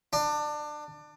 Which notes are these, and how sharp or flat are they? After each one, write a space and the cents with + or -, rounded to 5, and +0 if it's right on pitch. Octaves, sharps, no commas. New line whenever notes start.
D4 +25